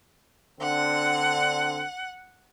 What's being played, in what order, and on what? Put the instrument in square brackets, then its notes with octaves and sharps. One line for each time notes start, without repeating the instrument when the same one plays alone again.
[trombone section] D3 C4 D4 [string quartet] F#5